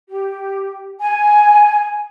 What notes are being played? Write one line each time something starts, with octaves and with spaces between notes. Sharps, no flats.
G4
G#5